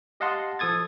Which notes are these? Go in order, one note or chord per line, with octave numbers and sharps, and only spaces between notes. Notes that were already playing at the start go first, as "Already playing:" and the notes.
G4 D#5 F5 F#5 A5 C6
F3 A4 D#6 G#6 A6